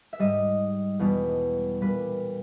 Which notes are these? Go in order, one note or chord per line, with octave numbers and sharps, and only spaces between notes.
E5
G#2 G3 D#5
E2 B2 G3
A#2 G3 B4